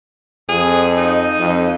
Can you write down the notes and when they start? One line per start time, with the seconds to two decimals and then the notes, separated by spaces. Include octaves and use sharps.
0.49 F2 G#4
0.98 D#4
1.39 F2